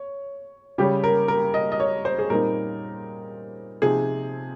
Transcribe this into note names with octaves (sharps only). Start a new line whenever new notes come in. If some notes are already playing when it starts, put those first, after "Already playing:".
Already playing: C#5
C#3 G3 C#4 G4
A#4
A#4
D#5
D#5
C#5
C5
G#4
A#2 G3 C4 D#4 A#4
C3 F3 C4 D#4 G#4